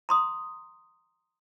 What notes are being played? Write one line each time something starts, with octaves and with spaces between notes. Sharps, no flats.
A#5 C6 D#6